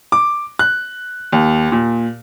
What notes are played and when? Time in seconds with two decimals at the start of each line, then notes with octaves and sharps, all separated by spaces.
0.12 D6
0.59 F#6
1.32 D#2
1.72 A#2